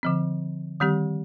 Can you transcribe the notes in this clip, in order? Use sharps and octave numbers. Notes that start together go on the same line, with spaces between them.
D3 F3 C4
D#3 G3 C4 G4